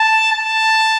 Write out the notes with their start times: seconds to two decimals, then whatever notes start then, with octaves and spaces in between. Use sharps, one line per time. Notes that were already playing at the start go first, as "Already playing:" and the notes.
Already playing: A5
0.33 A5